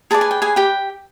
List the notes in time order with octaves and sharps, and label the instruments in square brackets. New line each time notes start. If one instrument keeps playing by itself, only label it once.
[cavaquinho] G#4 B4 D5 A5
G#5
G5
G#4 G#5
G4 G5